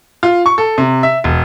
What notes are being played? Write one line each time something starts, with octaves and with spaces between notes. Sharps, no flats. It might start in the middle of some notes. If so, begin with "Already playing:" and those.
F4
C#6
A4
C3
E5
E1